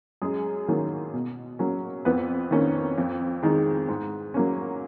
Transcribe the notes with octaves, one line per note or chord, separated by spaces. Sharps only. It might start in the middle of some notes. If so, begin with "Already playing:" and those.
F#2 G#3 G#4
D#3 F#3 A#3 C#4
B2
F#3 A#3 C#4
F2 B3 B4
D#3 A#3 C#4
F2
D#3 G#3
G#2
F#3 A#3 C#4